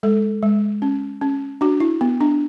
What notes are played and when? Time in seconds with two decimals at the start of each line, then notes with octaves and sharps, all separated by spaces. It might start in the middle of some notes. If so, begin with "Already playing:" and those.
0.03 G#3 A4
0.43 G#3
0.82 C#4
1.21 C#4
1.61 D4 F#4
1.80 E4
2.01 B3
2.21 D4